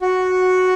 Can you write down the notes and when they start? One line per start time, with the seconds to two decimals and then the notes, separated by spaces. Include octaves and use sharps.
0.02 F#4